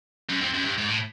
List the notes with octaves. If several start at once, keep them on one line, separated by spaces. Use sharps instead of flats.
F#2
F2
F#2
G2
G#2
A2